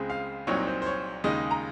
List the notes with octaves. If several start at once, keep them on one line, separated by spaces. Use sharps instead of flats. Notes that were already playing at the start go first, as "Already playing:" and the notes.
Already playing: C#2 C#3 G#3 C4
F5
C2 A#2 F#3 C4 D#4 C#5
C5
C5
C#5
D#2 C#3 G#3 D#4 D#5
A#5